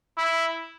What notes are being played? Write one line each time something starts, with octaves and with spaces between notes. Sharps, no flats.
E4